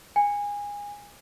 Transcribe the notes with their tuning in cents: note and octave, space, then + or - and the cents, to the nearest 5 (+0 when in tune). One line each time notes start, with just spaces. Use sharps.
G#5 -20